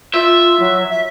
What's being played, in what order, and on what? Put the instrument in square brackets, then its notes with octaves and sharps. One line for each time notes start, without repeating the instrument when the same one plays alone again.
[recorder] F4 [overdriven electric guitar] E5
[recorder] F#3
E5